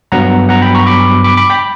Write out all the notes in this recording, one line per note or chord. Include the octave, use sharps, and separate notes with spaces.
G2 F#3 B3 F#5 A#5
F#5 A#5
G5 B5
A#5 C#6
B5 D6
B5 D6
B5 D6
G5 B5